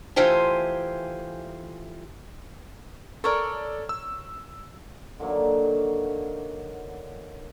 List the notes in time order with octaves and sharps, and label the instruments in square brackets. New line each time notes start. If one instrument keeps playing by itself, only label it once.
[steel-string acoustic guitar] E3 A3 F4 G4 C5 G#5
[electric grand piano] A4 D5 [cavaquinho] A#4 C#5
[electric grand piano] E6
[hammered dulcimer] D3 D#3 F#3 A#3